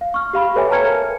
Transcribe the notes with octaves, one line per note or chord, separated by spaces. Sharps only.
F5
C#6 F6
G4 F5 B5
A4 B4 C#5 E5 G5 G#5
A5 A#5 F6 G#6 C#7
A#4